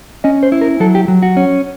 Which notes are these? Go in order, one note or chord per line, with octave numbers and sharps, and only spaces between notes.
C#4 D#5
C5
E4
A#4
F#3 A4
G4
F#3
F#4
C#4